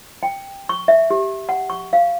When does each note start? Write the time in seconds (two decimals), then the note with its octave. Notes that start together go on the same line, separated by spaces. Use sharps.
0.23 G5
0.69 C#6
0.88 E5
1.10 G4
1.49 F#5
1.70 C#6
1.93 F5